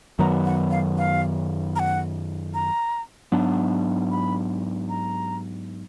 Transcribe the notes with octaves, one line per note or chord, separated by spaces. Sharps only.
F#2 D#3 F#3 B3 A#5
F#5
F5
F5
A#5
F#5
A#5
G#2 F#3 B3 D4
B5
A#5